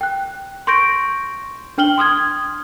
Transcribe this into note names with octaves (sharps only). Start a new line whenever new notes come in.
G5 F#6
C6 C#6 G6 A#6 D7
D4 G5 F6 F#7 G7
C6 D#6 F6 G#6